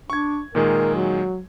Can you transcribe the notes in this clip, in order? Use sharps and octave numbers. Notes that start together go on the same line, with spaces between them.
D4 C#6 G#6
A#2 D#3 G#3 A#4
F#3